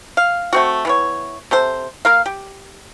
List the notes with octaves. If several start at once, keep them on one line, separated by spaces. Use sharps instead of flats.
F5
A3 C4 F#4
E3 B3 C#5
C3 A4 C5
A#3 A#4 F5
G4